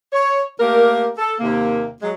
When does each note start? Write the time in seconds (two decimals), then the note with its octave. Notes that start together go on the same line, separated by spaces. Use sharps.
0.13 C#5
0.60 A3 A#3 G4 A#4
1.18 A4
1.40 D#2 C3 A#3
2.02 F#3 G#3